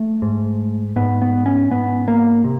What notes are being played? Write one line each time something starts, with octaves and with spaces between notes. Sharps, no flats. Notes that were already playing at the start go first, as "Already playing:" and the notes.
Already playing: A3
G#2
G#2 B3
B3
C#4
G#2 B3
A#3
C3